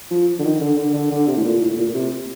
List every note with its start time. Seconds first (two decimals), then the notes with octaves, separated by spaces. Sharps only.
0.11 F3
0.39 D3
0.44 D#3
0.61 D3
0.77 D3
0.94 D3
1.11 D3
1.27 C3
1.37 A2
1.45 A#2
1.61 A2
1.78 A#2
1.89 A#2
1.94 C3